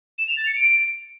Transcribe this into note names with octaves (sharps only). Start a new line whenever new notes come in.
E7
F7
A6
C#7
D7